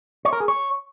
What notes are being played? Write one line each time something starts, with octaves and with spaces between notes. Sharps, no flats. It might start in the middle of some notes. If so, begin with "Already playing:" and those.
C#5
A#4
G#4
C#5